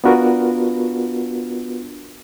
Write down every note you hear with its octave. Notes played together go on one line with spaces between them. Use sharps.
B3 D4 F4 F#4 A#4 B4